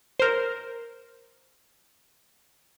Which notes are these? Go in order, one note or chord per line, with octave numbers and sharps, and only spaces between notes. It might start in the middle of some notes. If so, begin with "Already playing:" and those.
A#4 C5